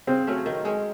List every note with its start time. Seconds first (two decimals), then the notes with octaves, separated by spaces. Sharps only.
0.07 C#3 C4
0.27 F#3 A3 C#4
0.46 D#3
0.65 G#3 C#4